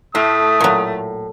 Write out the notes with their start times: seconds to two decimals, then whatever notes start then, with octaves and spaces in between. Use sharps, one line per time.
0.15 A2 A3 D#6
0.61 A#2 F#3